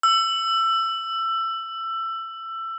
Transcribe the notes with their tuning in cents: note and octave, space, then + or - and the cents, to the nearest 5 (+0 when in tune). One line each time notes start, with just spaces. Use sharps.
E6 +20